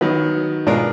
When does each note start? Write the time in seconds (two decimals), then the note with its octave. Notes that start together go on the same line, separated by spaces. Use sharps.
0.01 D#3 F#3 B3
0.67 B2 G#3 D4 F4 A#4